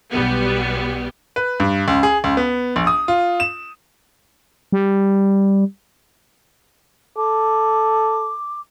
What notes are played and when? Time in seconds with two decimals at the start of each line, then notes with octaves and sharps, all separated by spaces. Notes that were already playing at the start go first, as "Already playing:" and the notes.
0.10 B1 G3 B3
1.36 B4
1.60 G2
1.88 C#2
2.03 G#4
2.24 C#2
2.37 B3
2.76 A#1
2.87 D#6
3.08 F4
3.40 E7
4.72 G3
7.17 A4 D6